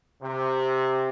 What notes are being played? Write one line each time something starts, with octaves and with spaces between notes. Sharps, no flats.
C3